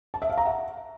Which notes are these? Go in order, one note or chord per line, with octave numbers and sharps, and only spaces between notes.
A5
E5
F5
A#5
F#5